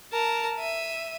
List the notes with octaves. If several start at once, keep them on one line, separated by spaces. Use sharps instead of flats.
A#4 A5
E5 D#7